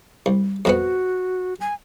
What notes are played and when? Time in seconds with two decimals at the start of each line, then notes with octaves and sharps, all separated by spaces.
0.26 C2
0.65 F2 B2 B3 F#4
1.60 G#5